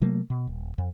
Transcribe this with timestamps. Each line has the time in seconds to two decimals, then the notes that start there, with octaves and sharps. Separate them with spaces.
0.01 C3 F#3 A3 A#3
0.30 B2
0.47 D#1
0.78 F2